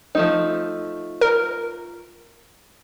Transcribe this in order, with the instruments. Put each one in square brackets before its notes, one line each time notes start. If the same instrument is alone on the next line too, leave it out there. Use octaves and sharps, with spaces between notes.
[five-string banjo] F3 A3 D#4
[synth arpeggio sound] A#4